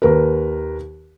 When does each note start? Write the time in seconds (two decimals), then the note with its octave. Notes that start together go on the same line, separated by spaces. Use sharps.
0.02 D#2 A#4 B4